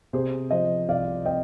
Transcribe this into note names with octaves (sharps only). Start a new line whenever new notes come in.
C3 G#4 C5
F3 C5 D#5
C2 D5 F5
C4 D#5 G5